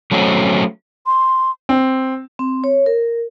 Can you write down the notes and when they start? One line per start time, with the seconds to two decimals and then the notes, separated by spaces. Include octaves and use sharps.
0.11 F#3 A3 C4 C#4
1.06 C6
1.69 C4
2.39 C4
2.64 C#5
2.86 A#4